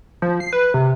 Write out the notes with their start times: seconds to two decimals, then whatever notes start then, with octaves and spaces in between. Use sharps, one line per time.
0.22 F3
0.40 C7
0.53 B4
0.74 C3